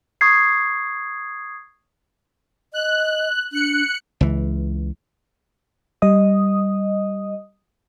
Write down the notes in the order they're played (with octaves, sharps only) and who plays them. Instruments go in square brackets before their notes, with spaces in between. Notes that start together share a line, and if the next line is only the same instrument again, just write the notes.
[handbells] C#6 D#6 G#6 C7
[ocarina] D#5 [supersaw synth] F#6
[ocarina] D4 [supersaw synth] F#6 C#7
[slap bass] C#2 E3
[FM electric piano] G3 D#5 D#6